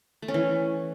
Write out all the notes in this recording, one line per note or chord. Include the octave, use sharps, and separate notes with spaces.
A3
C#4
E3